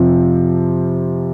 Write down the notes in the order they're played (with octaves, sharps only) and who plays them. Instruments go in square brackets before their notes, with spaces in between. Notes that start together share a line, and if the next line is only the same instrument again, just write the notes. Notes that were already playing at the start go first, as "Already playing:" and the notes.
Already playing: [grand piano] F2 C3 F3